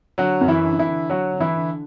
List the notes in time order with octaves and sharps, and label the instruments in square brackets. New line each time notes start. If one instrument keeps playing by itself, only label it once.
[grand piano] D3 F#3 F#4
F#2
E3 E4
D3
E3 E4
D3
D3 F#3 F#4
D3
E3 E4
D3